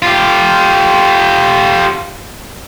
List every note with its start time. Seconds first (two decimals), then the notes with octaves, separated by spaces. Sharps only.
0.02 F4 G4